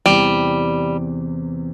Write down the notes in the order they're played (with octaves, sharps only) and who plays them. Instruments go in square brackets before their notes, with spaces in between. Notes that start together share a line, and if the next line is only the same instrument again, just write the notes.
[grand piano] E2 C3 E3 [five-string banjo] G3